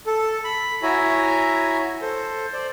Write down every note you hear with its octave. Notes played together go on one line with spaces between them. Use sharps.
A4
B5
E4 F#4 C#5 E5 G#5 A#5
A4 C5
C5 D5